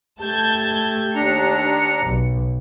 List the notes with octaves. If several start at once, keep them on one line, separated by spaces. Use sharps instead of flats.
A3 G4 A5 G6 G#6
D#2 D4 A#5 C#7
B1